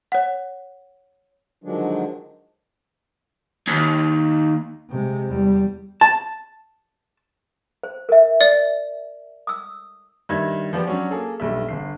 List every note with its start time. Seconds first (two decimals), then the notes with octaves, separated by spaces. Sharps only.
0.12 C#5 F#5
1.64 D3 D#3 F3 F#3 G#3 D4
3.67 D#2
4.90 C3 G#3
5.29 E2 G3
6.01 A5
7.83 C5
8.09 A#4 E5
8.41 D5
9.47 D#6 E6
10.29 G2 D#3 E5 G#6
10.73 F3 B3 D4 G4
10.85 F#3 C#4 D4
11.11 A#3 G#4 A4
11.40 B1 G2 E5
11.69 G1 C7